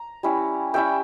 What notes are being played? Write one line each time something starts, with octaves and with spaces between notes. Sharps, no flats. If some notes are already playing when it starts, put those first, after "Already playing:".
Already playing: A#5
G3 C#4 E4
G3 C#4 E4 E5 G5